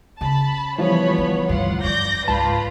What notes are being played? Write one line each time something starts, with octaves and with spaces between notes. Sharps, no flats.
C#3 A5 B5
E3 F3 G3 B3 C#5 B5
D#4
D2 G2 F4 F#5
G2 D5 G6 A#6
C#2 G#2 F4 B4 A5 B5